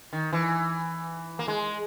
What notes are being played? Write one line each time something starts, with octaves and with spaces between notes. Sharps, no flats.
D#3
E3
A#3
G#3